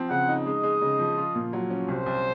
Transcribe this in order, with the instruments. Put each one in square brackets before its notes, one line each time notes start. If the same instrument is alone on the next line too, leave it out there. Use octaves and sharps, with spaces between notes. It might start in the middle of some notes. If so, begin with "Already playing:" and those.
Already playing: [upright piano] F3 C4
[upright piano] C#3 [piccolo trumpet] F#5
[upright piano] D#4
[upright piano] G#3 [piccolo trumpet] D#5
[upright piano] G#3
C#3
F3
F4
A#2
F#3
C#4
[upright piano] C2 [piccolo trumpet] C5
[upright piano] C2